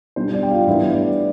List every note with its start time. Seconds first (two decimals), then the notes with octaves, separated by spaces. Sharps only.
0.16 B2 G3 D4 C5
0.34 D5
0.43 G5
0.51 F4 F5
0.67 A2 E3 G3 B3 D4 E4 E5
0.93 D5